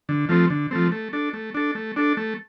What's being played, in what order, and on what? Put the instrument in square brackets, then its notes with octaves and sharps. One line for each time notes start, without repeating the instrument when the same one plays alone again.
[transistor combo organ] D3
F3 A3 C4
D3
F3 A3 C4
A3
D4 A4
A3
D4 A4
A3
D4 A4
A3